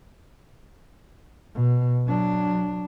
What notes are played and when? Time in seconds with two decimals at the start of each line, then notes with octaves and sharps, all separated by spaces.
1.55 B2
2.07 F#3 D4